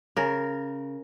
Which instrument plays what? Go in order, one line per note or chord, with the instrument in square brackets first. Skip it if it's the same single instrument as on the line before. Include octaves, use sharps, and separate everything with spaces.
[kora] C#3 A#4